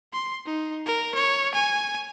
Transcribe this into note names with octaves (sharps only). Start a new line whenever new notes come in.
C6
D#4
A#4
C#5
G#5